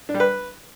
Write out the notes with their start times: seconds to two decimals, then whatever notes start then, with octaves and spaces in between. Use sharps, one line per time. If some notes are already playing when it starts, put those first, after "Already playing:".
0.09 D4
0.14 G3
0.20 B4